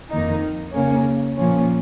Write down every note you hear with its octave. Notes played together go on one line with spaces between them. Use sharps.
F2 D#3 A#3 D#4
C#3 A#3 C#4
A#2 F3 C#4